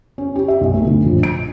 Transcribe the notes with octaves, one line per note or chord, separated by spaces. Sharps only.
C#4
G4
E5
B1
A3
D2
A#1
D7